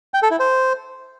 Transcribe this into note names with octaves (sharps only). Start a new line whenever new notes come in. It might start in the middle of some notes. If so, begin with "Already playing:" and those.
G5
A4
E4
C5